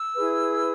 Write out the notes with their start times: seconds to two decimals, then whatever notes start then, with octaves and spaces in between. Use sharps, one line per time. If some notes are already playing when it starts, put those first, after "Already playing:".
Already playing: E6
0.15 E4 G#4 B4